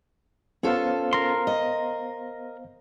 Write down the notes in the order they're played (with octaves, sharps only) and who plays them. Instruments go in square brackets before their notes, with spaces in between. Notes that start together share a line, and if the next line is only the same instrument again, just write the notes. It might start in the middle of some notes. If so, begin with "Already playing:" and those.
[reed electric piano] B3 C5 F5 [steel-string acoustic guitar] C#4 F4 A4
[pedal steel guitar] A#4 C6
[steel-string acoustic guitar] D#5